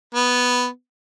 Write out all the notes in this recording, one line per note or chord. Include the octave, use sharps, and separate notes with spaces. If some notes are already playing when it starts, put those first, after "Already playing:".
B3